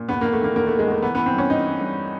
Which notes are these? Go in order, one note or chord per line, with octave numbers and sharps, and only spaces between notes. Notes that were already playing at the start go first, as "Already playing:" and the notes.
Already playing: A#2
E2 B3
A#3
E2
A3
D#3 A#3
E2 A#3
A3
D#3
G#3
E2 A3
E3 B3
B3
E3
C4
G2 C#4
E3 D#4
E3
G2